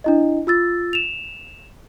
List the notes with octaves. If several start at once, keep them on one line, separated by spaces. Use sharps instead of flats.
D4 E4 D#5
F4 E6 A6
E7 F7